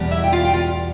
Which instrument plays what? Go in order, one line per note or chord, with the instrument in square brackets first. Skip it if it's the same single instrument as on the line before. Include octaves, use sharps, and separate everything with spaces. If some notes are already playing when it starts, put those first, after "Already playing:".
Already playing: [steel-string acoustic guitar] E2 B2 G3
E4 E5
G5
F4 F5
G5
F4 F5